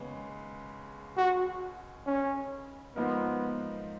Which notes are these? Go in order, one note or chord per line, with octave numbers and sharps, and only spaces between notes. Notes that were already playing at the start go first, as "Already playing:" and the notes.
Already playing: D#2 C#3 G#3 B3
F#4
C#4
G#2 F3 A#3 B3 D#4 A#4